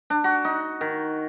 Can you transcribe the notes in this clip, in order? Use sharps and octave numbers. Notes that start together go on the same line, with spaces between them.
D4
F#4
D#4
D#3